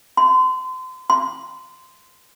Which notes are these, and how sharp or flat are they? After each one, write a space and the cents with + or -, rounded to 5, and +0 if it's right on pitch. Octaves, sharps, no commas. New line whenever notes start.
C6 -35
C6 -15